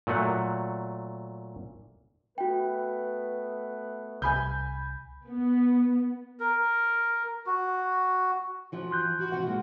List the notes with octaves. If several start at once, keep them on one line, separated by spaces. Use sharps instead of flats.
A#2 F#3 A3 F#5
A3 B3 F#4 B4 G5
C2 G#5 B5 G6
B3
A#4
F#4
E3 F3 F#4
C6 F#6 G6
E3 F#4
C3 F3 F#5
G#3 A#3 F#4